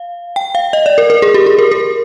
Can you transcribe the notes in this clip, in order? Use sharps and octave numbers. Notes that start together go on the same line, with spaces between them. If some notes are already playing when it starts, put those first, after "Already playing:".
Already playing: F5
G5
F5
D#5
D5
A#4
A#4
G#4
G4
G#4
A#4
A#4